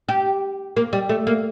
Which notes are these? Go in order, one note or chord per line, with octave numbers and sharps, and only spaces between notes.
G4
A#3
G3
A3
A#3